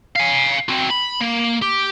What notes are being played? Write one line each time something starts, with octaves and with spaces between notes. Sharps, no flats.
F5 G#5
C4 F#4
B5
A#3
G4